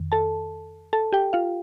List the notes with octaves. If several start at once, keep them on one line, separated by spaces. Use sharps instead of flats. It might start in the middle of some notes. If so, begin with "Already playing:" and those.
Already playing: F2 D#3
A4 A5
A4 A5
G4 G5
F4 F5